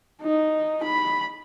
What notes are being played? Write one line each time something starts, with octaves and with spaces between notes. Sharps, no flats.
D#4
B5